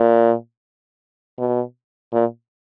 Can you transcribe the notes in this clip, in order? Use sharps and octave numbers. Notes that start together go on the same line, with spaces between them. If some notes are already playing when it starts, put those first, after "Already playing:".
Already playing: A#2
B2
A#2